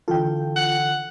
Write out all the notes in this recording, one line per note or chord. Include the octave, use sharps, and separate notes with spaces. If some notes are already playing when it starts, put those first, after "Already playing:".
D3 E3 F4 A4 G5
F#5